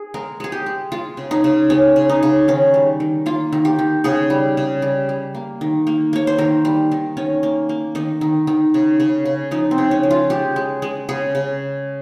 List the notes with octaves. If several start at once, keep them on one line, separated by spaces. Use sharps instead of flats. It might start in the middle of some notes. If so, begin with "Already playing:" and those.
Already playing: G#4
G#3 A#4
G#3 G#4
G4
G#3
G#3 F4
C#3
D#4
C#3
G#3 C#4
C#3
D#4
C#3
D#3 C#4
G3
D#3
A#3 F4
D#3
G4
D#3
C#3 G#4
G3
C#3
G3
G3
A#3
D#3
A#3
A#3 C#5
C5
D#3 A#4
G3
D#3
D#3 C#4
A#3
A#3
D#3 D#4
D#3
D#3
C#3
C#3
C#3
F3 D#4
C4
C#3
C#4
F3
F4
G#3 G4
G#3
G#3
C#3 G#4
C#3